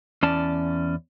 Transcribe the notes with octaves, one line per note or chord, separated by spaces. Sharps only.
E2 C#4 D5 A5